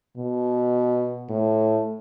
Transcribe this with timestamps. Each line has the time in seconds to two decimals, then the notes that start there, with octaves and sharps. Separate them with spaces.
0.17 B2
1.29 A2